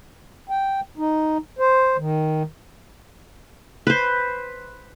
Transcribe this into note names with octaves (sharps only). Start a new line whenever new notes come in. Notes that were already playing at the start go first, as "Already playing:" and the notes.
G5
D#4
C5
D#3
B4 C5